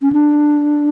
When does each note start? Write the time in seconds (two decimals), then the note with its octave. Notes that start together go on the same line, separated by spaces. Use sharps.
0.02 C#4
0.13 D4